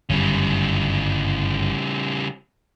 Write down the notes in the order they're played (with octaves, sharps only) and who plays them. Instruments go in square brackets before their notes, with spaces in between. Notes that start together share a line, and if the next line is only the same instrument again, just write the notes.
[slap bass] G1 F#2 [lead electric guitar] C#3 G3